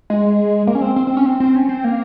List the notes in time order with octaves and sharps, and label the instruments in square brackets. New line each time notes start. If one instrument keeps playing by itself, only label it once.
[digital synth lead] G#3
A#3
C#4
C4
C4
C4
C#4
C4
C4
C#4
C4
A#3